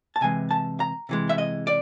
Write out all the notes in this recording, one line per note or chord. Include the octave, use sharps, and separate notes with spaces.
A5
C3 E3 G#3 G#5
A5
A#5
C3 E3 G#3
E5
D#5
D5